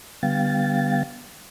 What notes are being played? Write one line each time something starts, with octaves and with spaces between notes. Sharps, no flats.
D3 G3 B3 F5 G5 A6